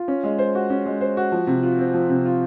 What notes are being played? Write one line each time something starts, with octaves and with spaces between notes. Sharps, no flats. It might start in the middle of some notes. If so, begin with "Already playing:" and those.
Already playing: F4
C#4
G#3
C5
F#4
C#4
G#3
C5
F#4
F3
C3
F4
C4
F3
C3
F4